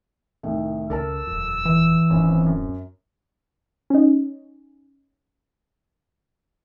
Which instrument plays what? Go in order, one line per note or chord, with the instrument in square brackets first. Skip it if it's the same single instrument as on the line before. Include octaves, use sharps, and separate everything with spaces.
[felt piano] C2 A2 D#3
[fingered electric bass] C#2 [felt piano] A4 A#4 A5 [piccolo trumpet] E6
[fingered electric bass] D#1 F2
[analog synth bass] E3
[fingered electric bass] D1 A2 C4 [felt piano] G#1 C#4
[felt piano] F#2
[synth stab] C#4 D#4